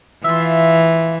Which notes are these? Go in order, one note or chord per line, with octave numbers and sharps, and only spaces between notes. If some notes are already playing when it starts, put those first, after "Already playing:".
E3 F4 E5